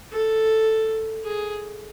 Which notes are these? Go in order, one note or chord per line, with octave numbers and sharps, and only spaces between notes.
A4
G#4